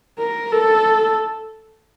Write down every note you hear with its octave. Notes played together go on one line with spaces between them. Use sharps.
A#4
A4